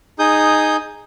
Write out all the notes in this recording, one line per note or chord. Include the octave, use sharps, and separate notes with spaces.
D#4 G#4 D#6 G6